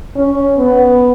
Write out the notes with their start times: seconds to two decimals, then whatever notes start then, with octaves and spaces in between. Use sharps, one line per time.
0.16 C#4
0.58 B3